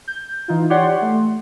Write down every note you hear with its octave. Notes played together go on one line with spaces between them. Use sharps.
G6
E3 D#4 F4
G4 C#5 D5 F#5 C6
A3